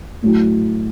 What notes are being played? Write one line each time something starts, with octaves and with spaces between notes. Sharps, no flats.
A2 F#3 A3 E4